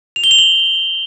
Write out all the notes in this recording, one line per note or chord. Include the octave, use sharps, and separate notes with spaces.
F7
G7
F7
F#7